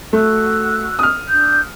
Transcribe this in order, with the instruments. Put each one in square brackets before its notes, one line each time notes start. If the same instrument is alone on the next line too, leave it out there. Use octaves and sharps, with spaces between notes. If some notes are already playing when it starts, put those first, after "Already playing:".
[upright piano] A3 [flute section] F#4 E6 F#6
[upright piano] D#6 F6
[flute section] D4 G6